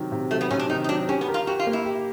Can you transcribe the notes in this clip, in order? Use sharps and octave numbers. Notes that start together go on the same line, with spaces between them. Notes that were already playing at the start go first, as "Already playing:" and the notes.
Already playing: C3 D#3 F#3
C3
F#3 A3
B3
C3 C#4
D4
D#3 D#4
D#4
F#3 D4
C#4 G4
B3
A#4
F4
F#4 G4
F4
A#3
E4
G4